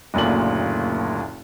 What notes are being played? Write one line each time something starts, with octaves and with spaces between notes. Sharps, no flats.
F#1 D2 A#2 F#7